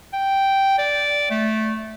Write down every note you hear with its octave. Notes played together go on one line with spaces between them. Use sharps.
G5
D5
A3